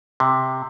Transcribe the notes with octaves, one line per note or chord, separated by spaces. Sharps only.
C3